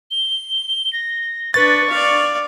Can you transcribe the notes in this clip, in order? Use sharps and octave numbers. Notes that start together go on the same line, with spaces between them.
G7
A#6
D4 B4 C#6 A6
D5 F5